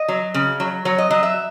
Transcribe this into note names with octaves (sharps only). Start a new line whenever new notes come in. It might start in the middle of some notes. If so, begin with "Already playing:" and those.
Already playing: D#5
F#3
C#3
F#3
F#3 C#5
D#5
F#3 D#5
E5